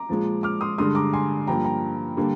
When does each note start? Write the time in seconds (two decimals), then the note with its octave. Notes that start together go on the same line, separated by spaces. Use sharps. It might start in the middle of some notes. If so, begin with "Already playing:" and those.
Already playing: A#5 D6
0.09 A#2 F3 G#3
0.43 D6 F6
0.61 C6 D#6
0.78 G2 D3 G#3 C6 D#6
0.95 A#5 D6
1.13 G#5 C6
1.47 G2 F3 A#3 G5 A#5
1.65 G5 A#5
2.17 D3 G3 A#3